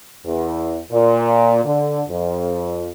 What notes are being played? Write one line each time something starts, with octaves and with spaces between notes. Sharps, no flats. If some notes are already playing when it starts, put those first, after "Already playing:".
E2
A#2
D3
F2